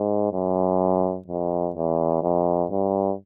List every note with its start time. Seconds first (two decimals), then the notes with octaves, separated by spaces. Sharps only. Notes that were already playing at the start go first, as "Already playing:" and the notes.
Already playing: G#2
0.33 F#2
1.27 F2
1.75 E2
2.22 F2
2.71 G2